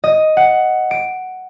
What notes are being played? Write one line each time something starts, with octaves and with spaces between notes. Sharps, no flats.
D#5
F#5
D7